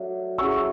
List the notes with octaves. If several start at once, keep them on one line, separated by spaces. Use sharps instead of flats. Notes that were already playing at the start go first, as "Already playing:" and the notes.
Already playing: F#3 A3 D4
F#3 C#4 E4 G#4 C#6 E6